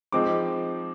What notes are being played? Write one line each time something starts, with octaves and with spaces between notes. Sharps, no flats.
F3 G#3 C4 D#4 D6